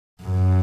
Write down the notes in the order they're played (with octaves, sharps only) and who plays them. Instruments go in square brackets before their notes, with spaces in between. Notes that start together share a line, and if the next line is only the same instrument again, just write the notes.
[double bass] F#2